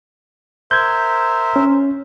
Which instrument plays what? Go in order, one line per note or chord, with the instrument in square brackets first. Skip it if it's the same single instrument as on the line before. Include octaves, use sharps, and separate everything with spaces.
[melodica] A#4 C5 E5 [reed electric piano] G6 G#6
[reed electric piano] C#4